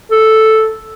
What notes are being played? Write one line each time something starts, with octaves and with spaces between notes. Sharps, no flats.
A4